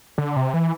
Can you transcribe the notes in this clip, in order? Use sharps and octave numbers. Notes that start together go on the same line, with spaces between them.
D3
C3
E3